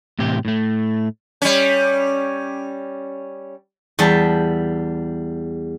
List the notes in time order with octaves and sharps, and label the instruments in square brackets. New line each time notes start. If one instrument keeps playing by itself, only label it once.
[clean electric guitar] A2 C3 E3 G4
A2 A3
[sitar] G3 C#4
[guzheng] E2 G3 E5 A5